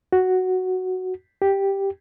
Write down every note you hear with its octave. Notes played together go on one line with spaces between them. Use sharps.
F#4
G4